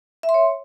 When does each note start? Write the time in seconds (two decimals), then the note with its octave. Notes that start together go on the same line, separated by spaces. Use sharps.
0.23 E5
0.29 C6
0.34 C#5